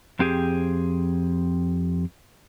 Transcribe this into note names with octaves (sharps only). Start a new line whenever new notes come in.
F2 C4 G4 G#4